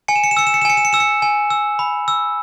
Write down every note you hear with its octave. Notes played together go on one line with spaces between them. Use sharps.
G#5 C#7
E7
C#7
E7
E6 C#7
E7
C#7
E7
G#5 C#7
E7
C#7
E6 E7
C#7
G#5
E6
B5
E6